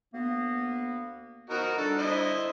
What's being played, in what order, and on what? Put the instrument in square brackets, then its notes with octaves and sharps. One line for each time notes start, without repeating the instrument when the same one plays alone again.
[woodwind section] D2 A#3 B3
[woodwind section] F3 B3 E4 [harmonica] D#4 F#4 A#4
[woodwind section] D3 G3 D4 [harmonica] A4
[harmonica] E4 C5 D#5